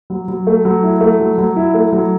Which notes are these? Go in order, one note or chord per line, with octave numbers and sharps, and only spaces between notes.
F#3
F#3
A3
F#3
E4
A3
F#3
F#3
E4
A3
F#3